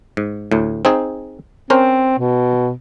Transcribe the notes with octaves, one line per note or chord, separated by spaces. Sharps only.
G#2
D2 A2
C4 D#4 G#4
C4 C#4 A#4 C5
B2